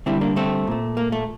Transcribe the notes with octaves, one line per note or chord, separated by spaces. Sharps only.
D3 G3 C4 E4
A#3 D4
A3 C4
A#2 A3
A#3
A3